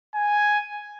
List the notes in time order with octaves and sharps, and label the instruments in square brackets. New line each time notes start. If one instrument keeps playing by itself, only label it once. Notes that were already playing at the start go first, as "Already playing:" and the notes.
[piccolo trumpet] G#5